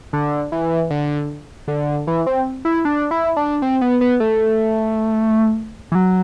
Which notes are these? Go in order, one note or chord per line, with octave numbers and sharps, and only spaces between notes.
D3
E3
D3
D3
E3
C4
E4
D4
E4
D4
C4
B3
B3
A3
E3
F#3